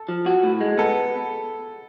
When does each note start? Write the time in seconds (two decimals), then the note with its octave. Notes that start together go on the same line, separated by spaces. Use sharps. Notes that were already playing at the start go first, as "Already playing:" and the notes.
Already playing: A4
0.09 F3
0.26 F#4
0.43 A2
0.61 G#3
0.78 B3 A4